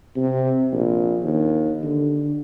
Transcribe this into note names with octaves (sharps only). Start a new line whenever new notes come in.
C3
A#1
D#2
D3